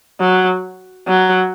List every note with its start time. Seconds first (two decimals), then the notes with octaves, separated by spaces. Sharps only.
0.20 F#3
1.07 F#3